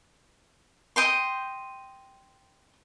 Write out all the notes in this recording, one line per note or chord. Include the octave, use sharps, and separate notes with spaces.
D#5 G5 C6